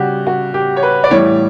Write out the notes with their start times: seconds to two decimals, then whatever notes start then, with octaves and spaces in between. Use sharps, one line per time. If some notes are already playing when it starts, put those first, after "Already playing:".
Already playing: C#3 G3 F#4 G4
0.27 F#4
0.54 G4
0.77 C#5
0.83 B4
1.04 D5
1.11 A2 E3 G3 C#5